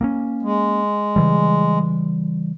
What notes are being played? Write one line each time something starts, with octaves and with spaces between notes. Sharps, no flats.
A#3 C4 C#4
G#3
C#3 E3 G3